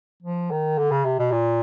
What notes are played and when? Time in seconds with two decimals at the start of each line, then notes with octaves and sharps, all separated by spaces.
0.23 F3
0.51 D#3
0.78 D3
0.91 C#3
1.05 C3
1.19 B2
1.32 A#2